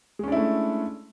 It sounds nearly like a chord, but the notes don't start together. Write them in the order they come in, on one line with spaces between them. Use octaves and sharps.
G#3 C#4 D4 E4 A3